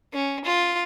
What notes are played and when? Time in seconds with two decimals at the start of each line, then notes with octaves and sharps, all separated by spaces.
0.13 C#4
0.45 F4